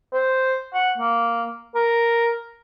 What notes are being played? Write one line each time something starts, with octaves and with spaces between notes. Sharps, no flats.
C5
F#5
A#3
A#4